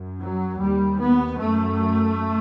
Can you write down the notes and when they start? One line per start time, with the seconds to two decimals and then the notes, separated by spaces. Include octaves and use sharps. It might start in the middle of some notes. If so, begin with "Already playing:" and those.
Already playing: F#2
0.21 F#3
0.60 D#2 G3
1.00 B3
1.40 F#2 A3